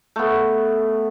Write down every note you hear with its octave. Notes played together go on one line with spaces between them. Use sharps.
A3 B3